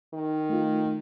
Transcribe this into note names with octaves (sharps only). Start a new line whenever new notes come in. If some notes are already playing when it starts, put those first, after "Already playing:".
D#3
A3 F4